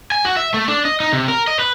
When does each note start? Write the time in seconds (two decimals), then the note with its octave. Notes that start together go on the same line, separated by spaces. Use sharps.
0.12 G#5
0.25 F#4
0.37 E5
0.54 A3
0.68 D4
0.85 D#5
1.00 D#4
1.13 C3
1.28 A#4
1.48 D#5
1.59 B4